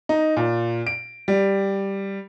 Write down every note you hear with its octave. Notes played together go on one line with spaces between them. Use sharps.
D#4
A#2
D7
G3